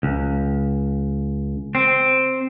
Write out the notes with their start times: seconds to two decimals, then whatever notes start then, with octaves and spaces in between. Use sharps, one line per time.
0.03 C#2
1.75 C4